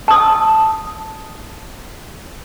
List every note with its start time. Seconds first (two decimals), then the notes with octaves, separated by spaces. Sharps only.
0.08 A5 D#6